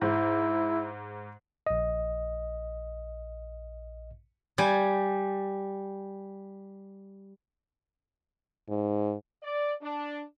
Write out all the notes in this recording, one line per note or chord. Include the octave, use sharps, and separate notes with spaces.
G#2 E4
A#1 D#5
G3 G#5
G#2
D5
D4